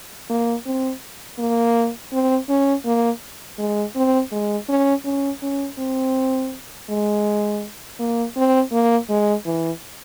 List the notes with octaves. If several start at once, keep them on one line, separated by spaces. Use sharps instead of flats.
A#3
C4
A#3
C4
C#4
A#3
G#3
C4
G#3
C#4
C#4
C#4
C4
G#3
A#3
C4
A#3
G#3
E3